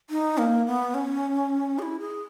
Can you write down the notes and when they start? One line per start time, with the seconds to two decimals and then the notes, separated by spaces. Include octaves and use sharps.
0.10 D#4
0.38 A#3
0.66 B3
0.94 C#4
1.79 G#4
1.82 E4
2.00 G#4